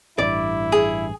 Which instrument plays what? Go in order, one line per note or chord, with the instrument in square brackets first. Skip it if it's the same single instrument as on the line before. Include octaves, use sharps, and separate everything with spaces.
[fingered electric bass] A1 G2 [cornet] E4 [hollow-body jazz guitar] D5
[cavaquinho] G#4